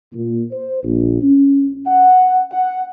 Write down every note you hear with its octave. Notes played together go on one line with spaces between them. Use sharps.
A#2
C5
A#1
C#4
F#5
F#5